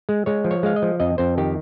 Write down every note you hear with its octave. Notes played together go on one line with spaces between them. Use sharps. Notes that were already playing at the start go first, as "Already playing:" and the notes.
G#3
G#3 C#5
F3
C#5
G#3 F5
D#5
F3
F2 D#5
F2 C5
D#3 G4